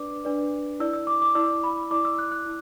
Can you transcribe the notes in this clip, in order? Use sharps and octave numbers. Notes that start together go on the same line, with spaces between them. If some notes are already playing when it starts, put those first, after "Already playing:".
Already playing: D4 B4 D5 D6
D4 B4 D5
E4 D5 E6
E6
D6
D6
E4 D5 E6
B5
E4 D5 D6
E6
F#6
F#6
E4